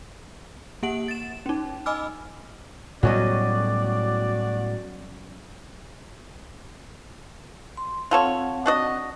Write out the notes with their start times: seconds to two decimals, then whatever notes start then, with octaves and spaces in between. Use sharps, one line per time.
0.83 A#3 G4 F#5 D7 F#7
1.08 A6 E7
1.46 C#4 D#4
1.86 D#5 G#5 B5 D6 E6 F6
3.03 A2 F#3 G3 B3 C#4 F#4 D5 D#5
7.77 C6
8.11 C4 F4 A4 C#5 F#5
8.66 D4 F#4 D#5